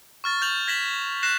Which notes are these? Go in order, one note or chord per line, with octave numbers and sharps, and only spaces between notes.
C#6 F6 A6
G6 F7 F#7
G#6 A#6 B6 E7 F#7
F#6 A#6 C7 E7